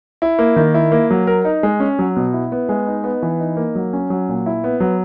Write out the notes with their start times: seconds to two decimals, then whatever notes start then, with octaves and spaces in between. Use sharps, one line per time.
0.22 E4
0.39 A#3
0.56 D#3
0.74 E4
0.92 A#3
1.10 F#3
1.27 A#4
1.45 D#4
1.63 G#3
1.80 C#4
1.99 F#3
2.16 B2
2.33 E4
2.52 B3
2.69 G#3
2.87 D#4
3.04 B3
3.23 E3
3.39 D#4
3.57 A#3
3.75 F#3
3.93 C#4
4.10 F#3
4.29 A#2
4.46 E4
4.64 B3
4.80 F#3